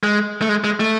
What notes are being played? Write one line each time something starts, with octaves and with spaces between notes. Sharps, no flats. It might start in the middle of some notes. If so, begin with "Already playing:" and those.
G#3
A3
G#3
G#3
A3